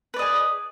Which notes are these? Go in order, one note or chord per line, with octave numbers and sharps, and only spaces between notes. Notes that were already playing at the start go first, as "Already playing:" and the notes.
G#4 B4 D5 D#5